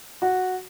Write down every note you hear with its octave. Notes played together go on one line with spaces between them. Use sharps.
F#4